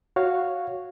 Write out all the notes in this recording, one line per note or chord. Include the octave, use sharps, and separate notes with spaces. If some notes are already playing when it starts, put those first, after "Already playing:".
F#4 C#5 F5